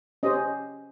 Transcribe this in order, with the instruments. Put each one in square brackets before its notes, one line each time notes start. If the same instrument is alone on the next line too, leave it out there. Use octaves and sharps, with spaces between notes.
[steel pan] C#4 G4 C5 D#5